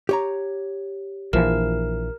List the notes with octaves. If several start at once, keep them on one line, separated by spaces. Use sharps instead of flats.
G4 C#5 A#5
A#1 E3 F3 A#4